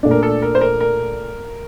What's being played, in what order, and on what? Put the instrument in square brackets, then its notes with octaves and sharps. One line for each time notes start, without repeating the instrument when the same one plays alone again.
[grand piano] A#2 A3 D4
[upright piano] A#4
A4
A#4
C5
A#4
A#4